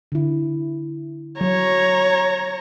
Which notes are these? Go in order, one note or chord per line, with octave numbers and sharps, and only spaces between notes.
D3 E4
F#3 C#5 A#5